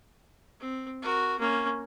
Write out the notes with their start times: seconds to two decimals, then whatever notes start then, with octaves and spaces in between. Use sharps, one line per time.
0.60 C4
1.02 F#4 A#4
1.39 A#3 C#4